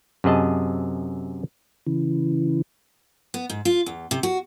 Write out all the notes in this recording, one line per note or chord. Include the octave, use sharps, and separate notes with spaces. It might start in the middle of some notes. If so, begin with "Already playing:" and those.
F#2 C3 G#4 D#5 A5
C#3 E3
B3
G#2
F4
E2
C3
F#4